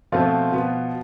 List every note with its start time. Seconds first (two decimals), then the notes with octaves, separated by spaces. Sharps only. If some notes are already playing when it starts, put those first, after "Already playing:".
0.12 B2 F3 A3 C4 F4
0.52 B2 B3